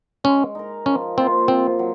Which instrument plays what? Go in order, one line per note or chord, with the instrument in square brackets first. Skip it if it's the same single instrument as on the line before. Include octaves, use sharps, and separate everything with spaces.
[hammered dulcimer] G#3 [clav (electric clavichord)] C#4
[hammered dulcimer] D#4 A#4
[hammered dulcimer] F3 [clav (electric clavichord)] C#4
[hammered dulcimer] A#3 F4 C5 [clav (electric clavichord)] C4
[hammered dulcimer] C3 [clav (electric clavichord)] C4
[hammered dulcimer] F#3